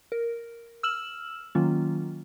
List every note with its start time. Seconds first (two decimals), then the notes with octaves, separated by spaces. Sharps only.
0.12 A#4
0.83 E6 F6 E7 F#7
1.55 D#3 F#3 A#3 C#4 F4